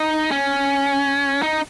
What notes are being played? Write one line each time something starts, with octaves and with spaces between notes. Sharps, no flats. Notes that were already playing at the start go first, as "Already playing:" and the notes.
Already playing: D#4
C#4
D#4